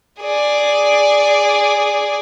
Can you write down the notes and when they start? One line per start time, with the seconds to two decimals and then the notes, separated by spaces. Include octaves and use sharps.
0.22 G#4 D5